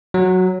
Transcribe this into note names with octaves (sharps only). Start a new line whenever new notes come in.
F#3